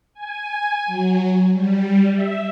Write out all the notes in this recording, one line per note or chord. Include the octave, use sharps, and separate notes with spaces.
G#5
F#3
G3
E5